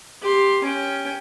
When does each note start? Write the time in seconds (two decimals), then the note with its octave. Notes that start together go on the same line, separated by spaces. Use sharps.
0.22 G4 C6
0.64 C#4 G5